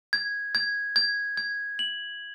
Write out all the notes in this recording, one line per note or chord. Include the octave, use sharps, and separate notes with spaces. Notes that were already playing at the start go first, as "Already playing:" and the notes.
G#6
G#6
G#6
G#6
F#7